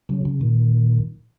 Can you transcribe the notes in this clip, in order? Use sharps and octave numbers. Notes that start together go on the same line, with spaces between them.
C#3 F#3
C#3
A#2 D#3